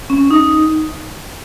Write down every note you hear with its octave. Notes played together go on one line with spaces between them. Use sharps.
C#4
D#4